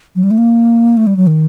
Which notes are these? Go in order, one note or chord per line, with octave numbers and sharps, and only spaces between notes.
F#3
G3
A3
A#3
A3
G3
F#3
D#3